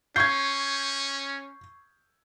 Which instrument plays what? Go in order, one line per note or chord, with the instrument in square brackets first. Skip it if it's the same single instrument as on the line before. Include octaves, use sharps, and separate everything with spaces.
[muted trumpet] C#4 [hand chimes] C#6 C7 [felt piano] G6 G#6